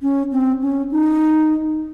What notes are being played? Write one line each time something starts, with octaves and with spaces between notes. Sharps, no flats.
C#4
C4
C#4
D#4